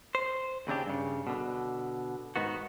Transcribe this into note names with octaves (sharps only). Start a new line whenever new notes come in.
C5
D#2 C#3 C4 D4 G4
G2 C#3
B2 D3
G#2 D#3 B3 F#4